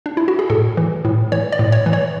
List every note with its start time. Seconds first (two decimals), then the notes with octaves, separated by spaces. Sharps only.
0.06 D4
0.17 E4
0.28 F#4
0.39 G#4
0.50 A2 A4
0.77 E3
1.05 A2
1.32 E3 C#5
1.52 D5
1.59 A2
1.72 C#5
1.86 E3
1.93 C#5